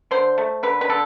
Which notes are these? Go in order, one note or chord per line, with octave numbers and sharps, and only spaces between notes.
D3 C5
A3
D3 B4
B4
D3 A4